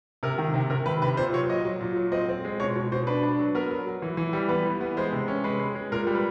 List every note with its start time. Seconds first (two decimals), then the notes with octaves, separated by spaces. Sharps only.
0.23 C3 A#4
0.38 D#3
0.54 C3
0.70 C3 A#4
0.86 D#3 B4
1.02 C3 B4
1.17 A#2 C5
1.33 F#3 C#5
1.49 F#3 D#5
1.65 F#3
1.81 A#2
1.96 F#3
2.12 C4 D#5
2.29 C4
2.45 G#3
2.60 B2 C#5
2.76 B2
2.92 B2 C5
3.07 D4 B4
3.23 D4
3.39 F#3
3.55 B3 A#4
3.70 F#3
3.87 F#3
4.02 E3
4.17 E3
4.33 G3
4.49 B3 B4
4.65 E3
4.81 B3
4.97 G#3 C5
5.12 C3
5.28 C#4
5.44 G#3 B4
5.59 G#3
5.75 G#3
5.92 A#2 A#4
6.07 G3
6.15 B4